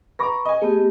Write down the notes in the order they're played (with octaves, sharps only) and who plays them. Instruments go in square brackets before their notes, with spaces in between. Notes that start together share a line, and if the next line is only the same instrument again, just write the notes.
[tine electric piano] B4 B5 C#6 [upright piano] A#5 D6 A#6
[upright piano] D#5 G#5
[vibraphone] A3 B3 G4 [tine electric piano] G#4